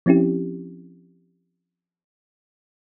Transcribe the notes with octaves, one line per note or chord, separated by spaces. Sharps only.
F3 C4 C#4 E4 G4